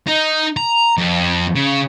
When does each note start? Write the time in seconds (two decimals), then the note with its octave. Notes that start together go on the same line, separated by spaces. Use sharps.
0.07 D#4
0.57 A#5
0.98 F2
1.55 C#3